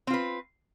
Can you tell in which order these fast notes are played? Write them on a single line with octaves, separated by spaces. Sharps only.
C4 F4 B4